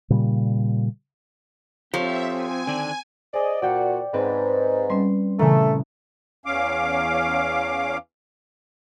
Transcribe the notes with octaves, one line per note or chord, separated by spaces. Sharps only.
A#2 C#3 G3
F3 C4 G4 A4 C#5 E5
G#5
D3 D#3 D4
G#4 C5 D5 D#5
A#2 F#4 D5 G5 C#7
G#2 C4 B4
G3 C#4 C6
A#2 C#3 E3 A3 G#5 A#5
E2 C#4 F5 D6